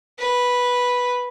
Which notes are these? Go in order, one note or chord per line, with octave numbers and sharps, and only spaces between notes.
B4